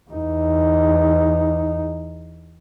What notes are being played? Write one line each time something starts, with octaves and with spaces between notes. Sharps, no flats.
E2 D#4